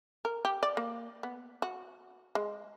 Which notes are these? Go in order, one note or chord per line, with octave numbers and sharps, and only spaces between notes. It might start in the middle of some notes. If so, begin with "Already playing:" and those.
A#4
G4
D5
A#3
B3
F#4
G#3